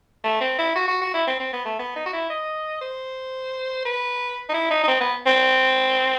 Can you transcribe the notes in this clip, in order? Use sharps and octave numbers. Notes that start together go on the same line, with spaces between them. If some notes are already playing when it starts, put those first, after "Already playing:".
A3
C4
E4
F#4
F#4
F#4
E4
C4
C4
B3
A3
B3
D#4
F#4
E4
D#5
C5
B4
D#4
E4
D#4
D#4
C4
B3
C4